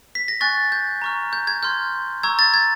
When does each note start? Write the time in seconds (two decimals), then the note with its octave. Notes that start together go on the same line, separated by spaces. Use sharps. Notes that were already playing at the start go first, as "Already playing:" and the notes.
0.15 B6
0.28 A#6
0.41 G#5 C#6 F#6 A6
0.72 G6
1.02 A#5 C#6 F6
1.33 G6
1.47 G#6
1.63 C6 F6 G6
2.23 A#5 C#6 E6 G#6
2.39 A6
2.54 G#6